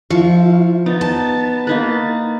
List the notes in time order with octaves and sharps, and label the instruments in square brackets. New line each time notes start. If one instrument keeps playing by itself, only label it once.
[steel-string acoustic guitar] F3 [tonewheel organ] E4 F4 [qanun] C#6
[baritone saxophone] B3 [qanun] D#4 [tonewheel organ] A6
[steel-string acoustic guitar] A5
[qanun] A#3 D#4 B4